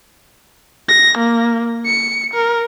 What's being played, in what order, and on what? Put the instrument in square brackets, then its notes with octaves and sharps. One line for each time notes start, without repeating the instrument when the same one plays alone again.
[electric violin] A#6
A#3
C#7
A#4